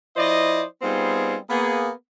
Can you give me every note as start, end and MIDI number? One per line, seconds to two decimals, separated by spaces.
0.16 0.63 53
0.16 0.63 64
0.16 0.63 72
0.16 0.63 74
0.16 0.63 75
0.82 1.37 55
0.82 1.37 59
0.82 1.37 60
0.82 1.37 63
0.82 1.37 65
0.82 1.37 68
1.49 1.90 58
1.49 1.90 59
1.49 1.90 68